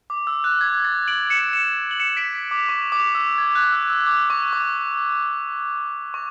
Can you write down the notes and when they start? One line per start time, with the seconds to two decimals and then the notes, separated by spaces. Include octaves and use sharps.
0.10 D6
0.27 E6
0.44 F#6
0.61 G#6
0.85 A6
1.08 D7 F#7
1.30 C#7 E7
1.53 C#7 E7
1.91 F#7
2.00 C#7 E7
2.17 B6 D7
2.51 D6
2.69 C#6
2.92 D6
3.15 E6
3.38 G#6
3.55 F#6
3.72 E6
3.90 E6
4.07 D6
4.30 C#6
4.53 D6
6.14 C#6